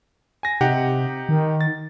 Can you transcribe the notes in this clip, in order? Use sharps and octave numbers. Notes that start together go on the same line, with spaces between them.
G#5 A#6
C3 D#4 G4 F#5
D#3
A6